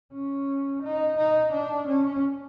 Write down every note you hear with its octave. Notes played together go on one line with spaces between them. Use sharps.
C#4
D#4
D#4
D4
C#4